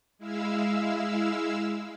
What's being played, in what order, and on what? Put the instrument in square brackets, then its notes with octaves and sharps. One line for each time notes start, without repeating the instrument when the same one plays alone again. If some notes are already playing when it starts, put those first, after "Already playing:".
[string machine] G#3 E4 F5 E6